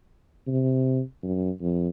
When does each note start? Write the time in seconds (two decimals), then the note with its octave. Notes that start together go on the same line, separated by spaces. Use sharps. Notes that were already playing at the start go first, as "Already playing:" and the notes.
0.47 C3
1.23 F#2
1.61 F2